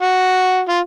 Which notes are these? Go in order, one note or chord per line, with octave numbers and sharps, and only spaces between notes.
F#4
F4